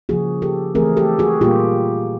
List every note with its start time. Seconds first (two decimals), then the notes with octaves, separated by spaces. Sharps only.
0.09 C#3 F3 A#3 F#4 G#4
0.42 G4 A4
0.75 E3 A3 C4 G#4 A#4
0.97 G4 A4
1.19 F#4 G#4
1.41 A#2 G3 A#3 F4 G4